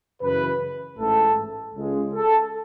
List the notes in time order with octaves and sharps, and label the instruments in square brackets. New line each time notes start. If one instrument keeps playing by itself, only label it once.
[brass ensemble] F#2 C#3 E3 B4
A1 G#2 E3 A3 A4
C#2 C#3 G#3
A4